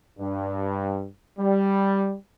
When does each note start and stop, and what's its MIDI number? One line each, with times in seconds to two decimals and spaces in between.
0.19 1.06 43
1.39 2.14 55